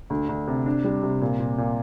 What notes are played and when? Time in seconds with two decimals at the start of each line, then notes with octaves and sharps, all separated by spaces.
0.10 D2
0.29 D2
0.47 C3
0.66 D4
0.84 G3
1.03 C3
1.21 A#2
1.39 A#2
1.58 A#2